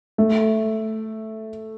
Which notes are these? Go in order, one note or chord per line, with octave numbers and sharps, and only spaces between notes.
A3